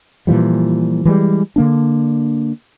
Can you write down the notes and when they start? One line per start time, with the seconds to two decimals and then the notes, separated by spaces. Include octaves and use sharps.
0.27 A#2 E3 F3 G3
1.05 E3 G3 G#3
1.56 D3 A#3 D4